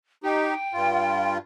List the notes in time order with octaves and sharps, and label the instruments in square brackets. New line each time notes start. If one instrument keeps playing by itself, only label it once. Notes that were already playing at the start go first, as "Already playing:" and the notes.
[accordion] D#4 G4 [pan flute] G5
[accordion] G2 F4